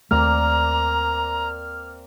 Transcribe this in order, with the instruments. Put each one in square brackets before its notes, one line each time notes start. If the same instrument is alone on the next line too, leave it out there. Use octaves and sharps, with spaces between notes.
[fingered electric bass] D#2 A3 [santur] A#3 C4 D5 [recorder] A#5 [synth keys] F6